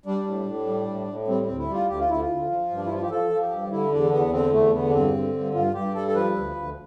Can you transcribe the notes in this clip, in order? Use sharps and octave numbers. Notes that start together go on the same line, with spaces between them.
G3 D4
A2
A2
G3
A2
A2
G3 C4
C4
D2
E4
G3 F4
D2 G4
F4
D2 E4
F4
D2
F3
G2
D4
E4
F3 F4
G4
F3 A4
F3
G4
G2
D3 E4
E2 D4
E2 B3
D3 C4
E2 A3
D3 B3
D4
G2 C4
D3
G2
G2 F4
G2 G4
G3 A4
A4
F3 B4
D2
D2